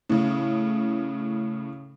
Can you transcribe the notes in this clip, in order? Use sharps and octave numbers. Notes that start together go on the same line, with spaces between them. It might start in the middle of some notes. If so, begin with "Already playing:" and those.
A2 C#3